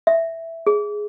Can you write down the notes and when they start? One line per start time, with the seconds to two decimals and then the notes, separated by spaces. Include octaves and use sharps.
0.07 E5
0.67 G#4